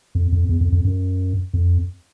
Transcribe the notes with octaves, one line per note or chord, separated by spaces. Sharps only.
F2
F2
E2
F2
F2
F#2
F2